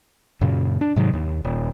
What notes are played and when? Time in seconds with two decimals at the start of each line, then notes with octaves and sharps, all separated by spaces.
0.41 F#2 A#2 C#3
0.81 D4
0.96 G#2 C3 D#3 F#3
1.13 D#2
1.45 D#1